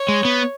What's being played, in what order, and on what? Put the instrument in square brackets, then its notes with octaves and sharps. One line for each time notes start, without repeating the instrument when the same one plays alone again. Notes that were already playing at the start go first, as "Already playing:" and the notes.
Already playing: [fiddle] C#5
[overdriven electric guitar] G#3
B3